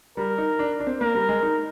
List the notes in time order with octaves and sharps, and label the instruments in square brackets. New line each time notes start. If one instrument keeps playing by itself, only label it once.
[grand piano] G3 [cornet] A#4
[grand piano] D#4
D4
D4
C4
[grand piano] A#3 [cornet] A#4
[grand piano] G3
G#3
D#4